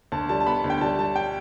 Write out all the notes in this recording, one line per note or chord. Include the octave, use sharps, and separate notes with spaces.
D2 A5
G3 A5
A5
B3 B5
D2
G5
G3 A5
G3 A5
G5